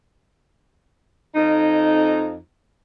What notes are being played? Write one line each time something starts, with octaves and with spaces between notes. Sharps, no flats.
F2 D#4